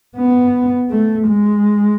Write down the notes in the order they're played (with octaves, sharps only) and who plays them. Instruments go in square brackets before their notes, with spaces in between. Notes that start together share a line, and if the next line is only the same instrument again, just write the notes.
[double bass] B3
A3
G#3